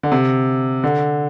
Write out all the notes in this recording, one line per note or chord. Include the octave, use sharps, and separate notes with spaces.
D3
C3
D3